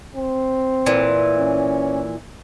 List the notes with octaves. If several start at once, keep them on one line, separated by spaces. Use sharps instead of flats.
C4
A#2 E3
C#4